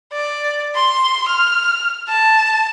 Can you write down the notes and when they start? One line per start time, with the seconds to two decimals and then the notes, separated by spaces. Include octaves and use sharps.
0.12 D5
0.75 C6
1.28 F6
2.09 A5